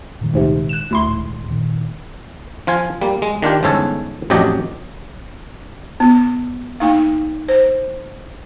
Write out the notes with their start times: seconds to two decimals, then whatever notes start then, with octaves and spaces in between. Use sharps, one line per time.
0.21 A#2 D#3 G#3
0.33 D2 G#2 C3
0.69 F#6 E7
0.91 D2 E4 C6
1.09 D#1 G#2
1.50 A#2 D#3
2.67 F3 F4 G#5
3.01 G3 A#3
3.22 G#3
3.42 D#3 D4 F4 G4
3.63 G1 E2 G#2 C#4 A4 C#5
4.30 A1 F2 F#3 D4 G4 D#5
6.00 B3
6.80 A#3 D#4 F5
7.48 C5